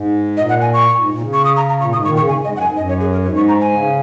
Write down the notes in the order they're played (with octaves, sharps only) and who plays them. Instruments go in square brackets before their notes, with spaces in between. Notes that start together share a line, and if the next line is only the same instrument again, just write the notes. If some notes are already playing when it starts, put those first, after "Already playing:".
Already playing: [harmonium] G#2
[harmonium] A#2 [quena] D#5
[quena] F#5
G#5
C#6
[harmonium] G#2
A#2
C#3
[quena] C#6
D#6
A#5
A#5
[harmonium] A#2 [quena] C#6
[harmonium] G#2 [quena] D#6
[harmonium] A#2 D#3 [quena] C#6
[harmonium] C#3 [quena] C#6
[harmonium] G#2 [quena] G#5
[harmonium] G#2 [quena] D#5
[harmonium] F#2 [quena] F#5
[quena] G#5
[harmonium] G#2
[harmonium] F#2 [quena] D#5
[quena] C#5
G#4
A#4
[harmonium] G#2 [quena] C#5
[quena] C#6
A#5
G#5
[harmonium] C#3